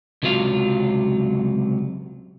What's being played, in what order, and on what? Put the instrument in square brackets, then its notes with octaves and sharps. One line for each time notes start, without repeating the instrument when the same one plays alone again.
[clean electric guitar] C#2 C3 F#3 F4 F5